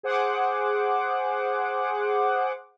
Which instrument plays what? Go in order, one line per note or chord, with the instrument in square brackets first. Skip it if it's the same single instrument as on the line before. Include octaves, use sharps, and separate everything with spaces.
[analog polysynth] G#4 C5 F#5 D6